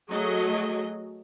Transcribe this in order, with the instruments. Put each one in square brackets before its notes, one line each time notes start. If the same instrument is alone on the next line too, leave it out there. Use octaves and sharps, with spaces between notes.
[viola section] F#3 A3 G#4 D#5